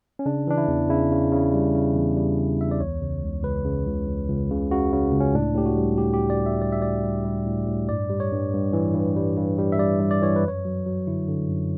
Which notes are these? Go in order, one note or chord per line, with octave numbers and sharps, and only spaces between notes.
C#4
C#3 D4
E3 D4
E4
E2
C#3 E4
C#3
C#3
G3
C#3
E2
G3
C#3
E2 E5
D5
C#2 C#5
C#3
C#2
C#2 B4
C#3
C#2
C#2
C#2
C#3
C#3 F#4
C#3
C#2
C#4
A2 D4
A2 G4
F#4
G3
A2 G4
G4
A2
D5
G3
E5
G3 D5
E5
A2 D5
G3
G3
A2
A2
G2 D5
G3
C#5
G2
G2
E3
G2
G3
G2
G3
E5
G3 D5
G3
D5
E3 C#5
B4
F#2 C#5
F#3
F#3
D3 E4
D3
F#2